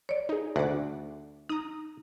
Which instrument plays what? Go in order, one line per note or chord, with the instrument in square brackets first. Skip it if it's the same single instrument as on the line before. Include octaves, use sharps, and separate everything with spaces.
[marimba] C#5 D5
[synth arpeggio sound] D#4 G#4
[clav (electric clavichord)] D2 [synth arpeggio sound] F#5 D6
[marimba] D#4 [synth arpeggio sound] A#5 D#6